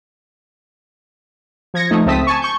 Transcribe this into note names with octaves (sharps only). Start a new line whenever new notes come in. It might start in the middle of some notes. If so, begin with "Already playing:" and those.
F3 G#6 A#6 C#7
F3 A3 D#4
C#2 A3 C4 A5 D#6 B6
G#5 A5 C#6
C#6 G6